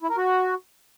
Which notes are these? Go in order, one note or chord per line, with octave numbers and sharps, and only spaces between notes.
E4
A#4
F#4